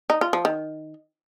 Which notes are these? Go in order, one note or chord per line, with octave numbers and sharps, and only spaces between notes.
D#4
F4
F3
D#3